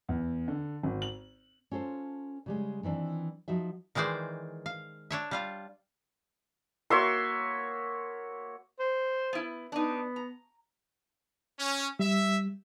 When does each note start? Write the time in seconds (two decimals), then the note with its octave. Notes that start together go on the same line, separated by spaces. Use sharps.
0.09 E2
0.48 D3
0.83 G#1
1.02 F#7
1.71 C#4 F4 A4 B4 C5
2.46 C#3 G3 G#3
2.83 D#3 E3 C4 D4
3.48 F3 D#4 F#4 E5
3.95 D#3 E3 G#3 C5 D5
4.66 F5
5.11 D4 C#5 E5
5.31 G3 F4 F5
6.90 A#3 F#4 C#5 E5 C6
8.80 C5
9.33 B3 E4
9.72 B3 D4 D#4
10.16 A#5
11.60 C#4
11.99 G3 E5